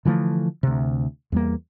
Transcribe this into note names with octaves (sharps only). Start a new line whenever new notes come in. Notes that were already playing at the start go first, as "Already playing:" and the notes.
D3 E3 F3 A3
D2 C3
E2 G3 A#3